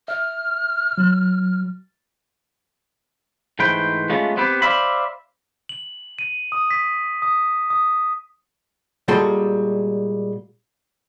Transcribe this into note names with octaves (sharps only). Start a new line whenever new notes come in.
E5 F6
F#3
G#2 E3 A3 B4 C5 G5
G#3 A3 B3 C#4 F4
B3 C4 G4 B4
C5 D5 E5 F5 B5
F#7
D#7
D#6
B6
D#6
D#6
A#2 G3 G#3 F#4 A4 C6